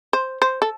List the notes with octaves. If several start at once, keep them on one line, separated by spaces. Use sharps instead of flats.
C5
C5
A4